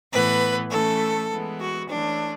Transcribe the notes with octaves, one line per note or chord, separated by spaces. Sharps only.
A2 E3 B3 B4
E3 A3 C#4 A4
E3 G#3 B3
F#4
E3 A3 C#4 D4